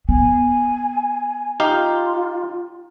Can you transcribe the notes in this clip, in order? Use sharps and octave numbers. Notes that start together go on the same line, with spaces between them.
B3 G#5
D#4 F4 G4 F5